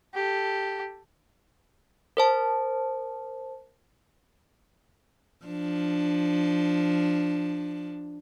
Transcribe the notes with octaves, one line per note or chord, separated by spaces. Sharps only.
G4 A4
A#4 C5 A5
F3 D4